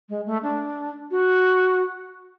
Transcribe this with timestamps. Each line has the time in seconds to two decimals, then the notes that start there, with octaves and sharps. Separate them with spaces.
0.09 G#3
0.26 A3
0.43 D4
1.11 F#4